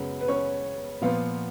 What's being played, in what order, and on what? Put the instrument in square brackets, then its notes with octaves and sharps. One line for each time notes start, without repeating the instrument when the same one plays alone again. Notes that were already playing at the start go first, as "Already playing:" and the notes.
Already playing: [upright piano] F#2 C#3 G#3 B3
B4
C#4 C#5
A#2 F3 B3 F4 F5